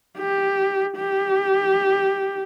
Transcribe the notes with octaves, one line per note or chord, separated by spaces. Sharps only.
G4
G4